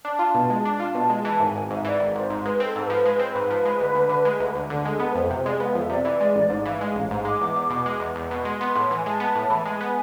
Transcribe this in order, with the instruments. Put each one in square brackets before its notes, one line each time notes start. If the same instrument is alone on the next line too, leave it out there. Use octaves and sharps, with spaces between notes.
[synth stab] D4 [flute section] A5
[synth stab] F4
B2
G#3
[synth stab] D4 [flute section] A5
[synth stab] F4
B2
G#3
[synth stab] E3 [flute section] A5
[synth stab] G#1 [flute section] G#5
[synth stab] G#1 [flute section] G#5
[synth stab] G#2 [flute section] E5
[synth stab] E3 [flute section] D5
[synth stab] G#1
[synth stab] G#1 [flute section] C5
[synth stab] G#2
[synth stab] G#3 [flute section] B4
[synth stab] C4 [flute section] A4 B4
[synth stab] G#2
[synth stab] F3 [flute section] B4
[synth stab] G#3 [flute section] B4
[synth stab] C4 [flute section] C5
[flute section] B4
[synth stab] G#2
F3
G#3
D2
D2
D3
G#3
D2
D2
D3
[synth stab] G#3 [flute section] A4
[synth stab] B3
[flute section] B4
[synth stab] F2 [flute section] C5
[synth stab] C3 [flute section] C5
[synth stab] G#3 [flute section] D5
[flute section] G#5
[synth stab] B3 [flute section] F5
[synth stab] F2 [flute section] E5
[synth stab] C3 [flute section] D5
[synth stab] E3
G#3
A1
G#2
[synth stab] E3 [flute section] F5
[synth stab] G#3
A1
G#2
[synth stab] G#3 [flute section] D6
[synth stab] E2
E2
B2
G#3
E2
E2
B2
[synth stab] G#3 [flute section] C6
[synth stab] B3
A2
[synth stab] E3 [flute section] G#5
[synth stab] G#3 [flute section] A5
[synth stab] B3
A2
[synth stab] E3 [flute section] B5
[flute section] A5
[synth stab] G#3 [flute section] G#5
[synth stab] B3